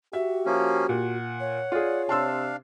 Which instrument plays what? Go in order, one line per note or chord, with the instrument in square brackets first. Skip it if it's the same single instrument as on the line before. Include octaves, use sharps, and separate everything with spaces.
[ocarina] F#4 [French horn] G4 [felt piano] E5
[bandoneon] F3 A#3 C#4
[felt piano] A#2 [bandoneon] F#5
[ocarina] C#5
[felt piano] F4 G#4 [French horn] D5
[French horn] C3 [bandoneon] D4 F5 [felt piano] A5 C6 E6